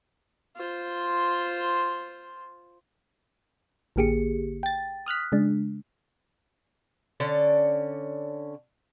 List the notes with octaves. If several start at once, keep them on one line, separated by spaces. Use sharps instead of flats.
F4 C5
A1 D3 A#3 G4 G#4 C#7
G5 A6
D#6 F6 F#6 B6
C#3 G#3 D4
D3 C#4 D5